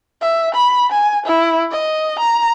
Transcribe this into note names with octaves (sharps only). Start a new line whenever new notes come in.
E5
B5
G#5
E4
D#5
A#5